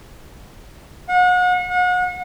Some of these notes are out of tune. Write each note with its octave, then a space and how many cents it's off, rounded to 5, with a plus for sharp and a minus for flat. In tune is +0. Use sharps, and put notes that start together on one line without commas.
F#5 -35
F#5 -35